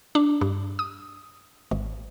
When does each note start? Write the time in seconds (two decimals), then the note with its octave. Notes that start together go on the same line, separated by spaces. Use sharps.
0.15 D4
0.41 G2
0.79 D#6
1.71 G#1